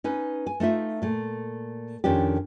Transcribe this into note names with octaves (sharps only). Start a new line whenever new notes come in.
C#4 D#4 B4
G#5
A3 D#4 F4 E5
A#2 A3
F2 D#3 C#4 D4 G4